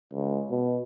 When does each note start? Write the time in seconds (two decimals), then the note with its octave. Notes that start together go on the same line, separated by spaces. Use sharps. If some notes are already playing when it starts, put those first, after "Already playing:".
0.13 C#2
0.50 B2